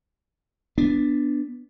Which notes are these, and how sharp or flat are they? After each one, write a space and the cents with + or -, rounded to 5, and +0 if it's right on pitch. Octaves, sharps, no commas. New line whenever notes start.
B3 +0 D4 +0